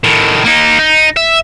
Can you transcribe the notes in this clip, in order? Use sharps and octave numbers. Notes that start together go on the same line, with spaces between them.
A2 D#3
A#3 D#4
D#4
E5